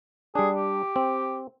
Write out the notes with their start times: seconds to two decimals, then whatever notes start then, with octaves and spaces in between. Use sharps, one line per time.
0.35 G3 D4 G#4
0.56 G4
0.96 C4